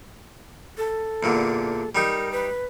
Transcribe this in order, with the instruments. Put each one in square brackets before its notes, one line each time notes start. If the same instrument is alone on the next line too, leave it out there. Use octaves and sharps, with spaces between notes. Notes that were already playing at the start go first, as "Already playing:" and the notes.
[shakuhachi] A4
[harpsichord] E2 A#2 D3
[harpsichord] G3 D#4 G4 [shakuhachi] A#4
[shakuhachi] B4